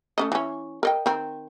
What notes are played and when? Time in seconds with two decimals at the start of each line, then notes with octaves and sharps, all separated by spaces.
0.18 A3 C#4 D#5
0.32 E3 C#4
0.83 A#4 D#5 G5
1.06 D#3 C4